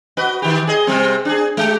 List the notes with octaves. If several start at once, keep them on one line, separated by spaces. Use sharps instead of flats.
F#4 B4 D#5
D#3 G4
G#4 D#5
C3 G3 C4
D4 G#4
G#3 G4